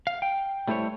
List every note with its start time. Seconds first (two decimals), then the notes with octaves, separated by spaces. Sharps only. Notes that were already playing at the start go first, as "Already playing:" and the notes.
0.07 F5
0.22 G5
0.68 G3 A3 E4 C5 C#5